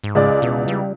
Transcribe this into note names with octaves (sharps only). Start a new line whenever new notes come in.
G#2
C#2 G#3 D5
E2 B2
G3